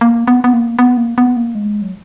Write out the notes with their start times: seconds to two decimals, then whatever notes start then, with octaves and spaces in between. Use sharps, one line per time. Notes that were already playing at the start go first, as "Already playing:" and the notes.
0.01 A#3
0.27 B3
0.44 B3
0.53 A#3
0.79 B3
0.97 A#3
1.18 B3
1.37 A#3
1.55 G#3
1.82 F#3